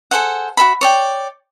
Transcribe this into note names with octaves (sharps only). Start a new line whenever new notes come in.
G#4 A4 C5 F#5
F#4 A4 E5 B5
C#5 D5 G5